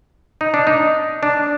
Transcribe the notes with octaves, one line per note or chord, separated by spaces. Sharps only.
D#4
D4
D#4
D4